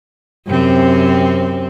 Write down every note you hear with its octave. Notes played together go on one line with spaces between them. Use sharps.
F#2 C3 C4